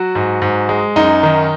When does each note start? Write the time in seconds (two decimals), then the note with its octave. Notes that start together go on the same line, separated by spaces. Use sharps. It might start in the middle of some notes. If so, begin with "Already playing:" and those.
Already playing: F#3 F#4
0.15 G#2
0.42 G#2
0.69 G#3
0.96 F#2 D#4
1.23 D#3